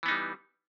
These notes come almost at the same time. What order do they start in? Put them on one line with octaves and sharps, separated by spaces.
E3 B3 D#4 G3